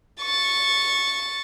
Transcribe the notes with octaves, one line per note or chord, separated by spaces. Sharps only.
C#6 A6